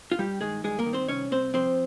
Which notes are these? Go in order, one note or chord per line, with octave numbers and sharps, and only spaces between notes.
F4
G2 G3 G4
D#3 G#3 G#4
G2 G#3 G#4
A#3 A#4
D#3
C4 C5
C2 C#4 C#5
C2 C4 C5
F3 C4 C5